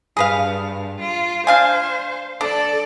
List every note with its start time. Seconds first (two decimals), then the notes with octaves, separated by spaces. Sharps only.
0.17 G2 G#4 B4 F5
1.00 F4
1.47 D4 C5 F5 G#5
2.41 D4 A4 D5